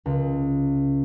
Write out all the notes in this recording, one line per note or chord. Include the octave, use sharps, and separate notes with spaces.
C#2